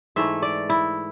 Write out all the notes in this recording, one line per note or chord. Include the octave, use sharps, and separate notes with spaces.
G#2 E3 A3 E5
D5
E4